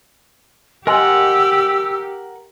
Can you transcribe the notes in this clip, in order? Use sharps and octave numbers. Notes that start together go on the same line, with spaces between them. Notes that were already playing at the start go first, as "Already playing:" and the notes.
G4 A#4 D#5 F#5 G#5 C6 E6